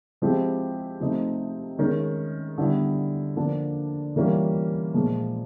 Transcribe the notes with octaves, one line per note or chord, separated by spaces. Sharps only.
F3 G#3 C4 E4 G4
C3 F3 A3 C4 D#4
D#3 G#3 C#4
D3 G3 B3 E4
D3 F3 A#3 D4
E3 G3 A#3 C#4 F4
A#2 F3 G#3